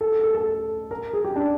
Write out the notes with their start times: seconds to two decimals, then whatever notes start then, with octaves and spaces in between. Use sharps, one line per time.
0.01 A4
0.12 A4
0.23 A4
0.34 A4
0.91 A#4
1.13 G#4
1.25 G4
1.36 D4